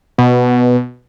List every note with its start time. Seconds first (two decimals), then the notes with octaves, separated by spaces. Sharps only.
0.18 B2